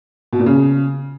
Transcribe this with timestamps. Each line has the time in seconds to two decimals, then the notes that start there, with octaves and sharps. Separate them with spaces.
0.33 B2
0.39 A#2
0.46 C#3